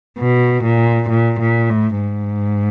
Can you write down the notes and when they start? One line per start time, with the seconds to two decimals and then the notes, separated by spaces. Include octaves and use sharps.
0.19 B2
0.64 A#2
1.09 A#2
1.40 A#2
1.70 A2
2.00 G#2